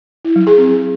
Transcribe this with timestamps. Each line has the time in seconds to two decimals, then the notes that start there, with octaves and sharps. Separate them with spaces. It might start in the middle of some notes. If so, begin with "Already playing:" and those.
0.25 E4
0.36 F#3
0.47 G#4
0.58 C4